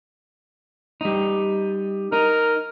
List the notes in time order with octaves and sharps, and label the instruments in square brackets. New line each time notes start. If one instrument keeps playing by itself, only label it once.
[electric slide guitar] G3 D#4
[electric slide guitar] D#4 [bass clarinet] A#4